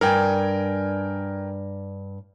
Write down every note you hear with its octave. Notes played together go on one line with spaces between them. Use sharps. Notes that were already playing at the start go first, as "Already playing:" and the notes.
G2 A#4 D5 G5 G#5